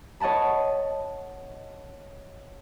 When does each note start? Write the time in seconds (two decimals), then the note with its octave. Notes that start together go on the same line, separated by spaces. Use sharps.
0.20 C#5 D#5 F#5 A5 B5